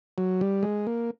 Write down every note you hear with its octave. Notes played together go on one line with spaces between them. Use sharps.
F#3
G3
G#3
A#3